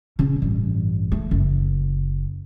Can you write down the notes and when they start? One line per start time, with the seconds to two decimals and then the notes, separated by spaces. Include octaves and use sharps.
0.19 C#3 C#4
0.42 A1 G2
1.12 A3
1.31 F#1